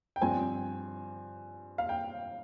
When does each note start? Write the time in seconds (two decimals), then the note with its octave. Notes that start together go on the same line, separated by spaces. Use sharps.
0.16 G5
0.22 G2 F3 C4 G#5
1.78 F5
1.89 G5